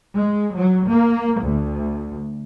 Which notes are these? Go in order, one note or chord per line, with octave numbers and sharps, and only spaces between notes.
G#3
F#3
A#3
D2